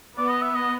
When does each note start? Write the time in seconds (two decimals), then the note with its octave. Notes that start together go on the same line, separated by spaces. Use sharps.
0.18 B3 D5
0.30 D#5
0.41 E5
0.55 D#5